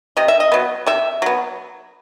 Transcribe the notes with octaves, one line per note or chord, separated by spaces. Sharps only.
C3 D#5
E5
D#5
F#3 B3
C3 E5
F#3 B3